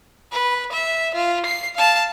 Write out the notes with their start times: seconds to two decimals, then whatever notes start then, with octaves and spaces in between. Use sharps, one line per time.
0.32 B4
0.72 E5
1.15 F4
1.46 C7
1.76 F5 A5